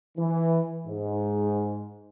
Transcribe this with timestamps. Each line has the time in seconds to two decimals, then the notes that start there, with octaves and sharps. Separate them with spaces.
0.18 E3
0.87 G#2